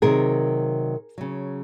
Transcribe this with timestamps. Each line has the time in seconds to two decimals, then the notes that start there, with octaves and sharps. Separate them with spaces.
0.02 C3 D#3 F#3 G#4 A#4
1.18 C#3 F#3